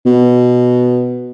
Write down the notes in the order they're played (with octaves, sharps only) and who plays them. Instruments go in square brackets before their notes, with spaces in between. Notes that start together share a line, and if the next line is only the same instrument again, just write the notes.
[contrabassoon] B2